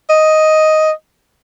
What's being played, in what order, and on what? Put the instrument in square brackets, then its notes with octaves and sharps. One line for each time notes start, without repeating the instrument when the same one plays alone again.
[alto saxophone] D#5